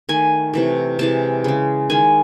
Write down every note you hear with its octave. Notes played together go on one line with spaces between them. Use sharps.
D#3 A3 G#5
C3 E3 A3
C3 E3 G#3 A5
C#3 G#3
D#3 G#3 G#5